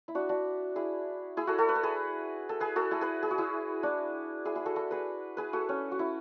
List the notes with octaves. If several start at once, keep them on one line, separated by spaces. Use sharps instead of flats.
E4
D4 F#4
D4 F#4
E4 G#4
E4 G#4
F#4 A4
F#4 A4
B4
A4
G#4 B4
A4
G#4 B4
F#4 A4
E4 G#4
G#4 B4
G#4
F#4
E4 G#4
D4 F#4
E4 G#4
E4 G#4
F#4 A4
F#4 A4
G#4 B4
G#4 B4
F#4 A4
C#4
F#4
E4